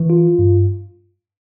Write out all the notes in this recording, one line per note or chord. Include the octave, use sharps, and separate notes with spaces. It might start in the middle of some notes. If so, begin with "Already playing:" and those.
Already playing: E3
F4
G2